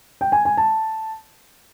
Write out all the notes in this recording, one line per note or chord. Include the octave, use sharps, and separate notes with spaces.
G5
G#5
G#5
A5